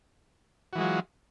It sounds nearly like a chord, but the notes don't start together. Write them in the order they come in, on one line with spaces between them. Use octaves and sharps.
F#4 E3 G#3 F#3 F4